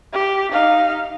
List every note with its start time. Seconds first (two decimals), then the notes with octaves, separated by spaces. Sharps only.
0.13 G4
0.52 D#4 F5